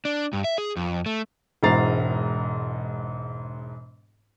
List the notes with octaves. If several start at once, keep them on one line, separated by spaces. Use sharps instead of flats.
D4
G2
E5
G#4
F2
A3
E1 G#2 E4 A#5 A6 C7